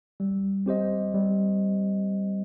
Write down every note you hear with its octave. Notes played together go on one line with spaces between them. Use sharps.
G3
C4 G4 C5 D#5
G3